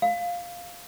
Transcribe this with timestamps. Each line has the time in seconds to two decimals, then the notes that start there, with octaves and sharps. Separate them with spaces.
0.02 F5